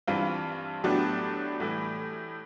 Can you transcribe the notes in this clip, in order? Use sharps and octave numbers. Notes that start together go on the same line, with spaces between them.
G2 E3 G3 C4 F4
A2 F#3 B3 D4 G4
A2 E3 G3